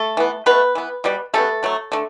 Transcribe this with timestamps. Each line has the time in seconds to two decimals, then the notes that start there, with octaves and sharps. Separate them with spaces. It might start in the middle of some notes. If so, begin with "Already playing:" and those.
Already playing: A3 A4
0.17 E3 B3
0.46 B2 A3 B3 B4
0.75 E3 B3
1.04 B2 G3 B3
1.34 C#3 G3 A3 B3 A4
1.63 D3 F#3 A3
1.92 D3 A3